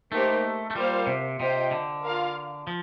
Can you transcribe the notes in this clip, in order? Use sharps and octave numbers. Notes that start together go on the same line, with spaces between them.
A3 A#3 D#4 G4 C5
A3
G3 A#3 F4 C5 F5
C3
C3 F4 C5 D#5 G5
D3
F4 A#4 F5
F3